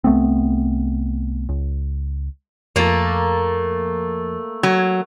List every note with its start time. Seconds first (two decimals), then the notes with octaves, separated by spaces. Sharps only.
0.04 C2 A3 B3 C4
1.49 C#2
2.76 F2 F3 A3 A#3 A6
4.63 F#3 G#6